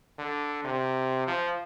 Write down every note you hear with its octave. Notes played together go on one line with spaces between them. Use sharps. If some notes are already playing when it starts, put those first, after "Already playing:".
D3
C3
F3